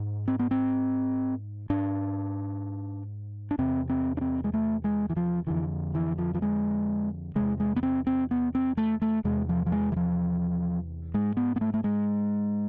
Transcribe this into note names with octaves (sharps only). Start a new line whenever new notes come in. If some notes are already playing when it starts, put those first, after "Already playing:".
Already playing: G#2
C4
B3
C4
G#2 D4
D4
E2 C3 C4
C4
D4
C4
G#3
A3
G#3
E3
F3
F2 D3 E3
E3
F3
F3
G#3
E2 C3 G#3
G#3
B3
C4
C4
B3
C4
A3
A3
E2 C3 G#3
F3
F3
G#3
E3
F3
G#2 G#3
B3
B3
A3
A3
G#3